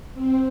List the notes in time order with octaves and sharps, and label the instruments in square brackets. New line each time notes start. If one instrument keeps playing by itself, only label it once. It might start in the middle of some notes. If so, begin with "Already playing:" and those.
[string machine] C4